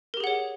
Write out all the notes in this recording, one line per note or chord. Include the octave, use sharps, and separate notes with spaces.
G4 G#4 A#4 C#5 F#5